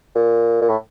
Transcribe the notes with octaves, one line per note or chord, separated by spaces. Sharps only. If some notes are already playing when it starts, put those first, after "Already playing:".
A#2
A#2
A2